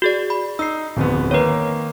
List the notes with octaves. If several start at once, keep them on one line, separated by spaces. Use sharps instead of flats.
F#4 G#4 D5
B5
D#4 E6 C7
D1 F2 B3
D#3 A#3 B4 C#5